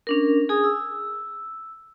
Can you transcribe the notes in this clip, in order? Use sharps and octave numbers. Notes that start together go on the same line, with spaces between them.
C#4 D4 A#4
G#4 G#5 D#6
E6